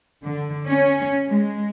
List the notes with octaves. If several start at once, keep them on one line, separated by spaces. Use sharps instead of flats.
D3
C#4
G#3